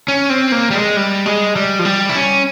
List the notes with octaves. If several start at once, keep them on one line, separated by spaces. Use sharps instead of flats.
C#4
C4
A#3
G3
G#3
G3
G#3
G3
F3
G3
E4
C#4